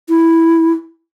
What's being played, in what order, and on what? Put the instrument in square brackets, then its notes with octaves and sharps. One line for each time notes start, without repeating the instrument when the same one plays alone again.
[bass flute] E4